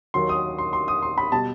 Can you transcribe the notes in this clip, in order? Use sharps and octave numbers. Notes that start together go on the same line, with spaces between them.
D#2 D#3 F#3 C6
D#6
C6
C6
D#6
C6
B5
B2 G3 A5